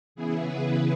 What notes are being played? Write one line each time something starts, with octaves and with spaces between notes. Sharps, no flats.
C#3 E3 B3 E4 G#4
G#4 B4